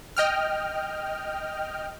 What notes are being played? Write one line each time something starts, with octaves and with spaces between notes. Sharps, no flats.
D#5 G5 F6